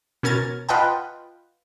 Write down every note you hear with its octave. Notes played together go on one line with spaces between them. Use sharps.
B2 C#4 A#4 G#6 A6
F4 B4 D#5 F#5 G5 A5